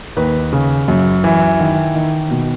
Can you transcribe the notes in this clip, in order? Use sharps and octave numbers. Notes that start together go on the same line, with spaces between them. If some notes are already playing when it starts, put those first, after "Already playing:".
D#2 B4
C#3
F#2
E3
D#3
D#3
B2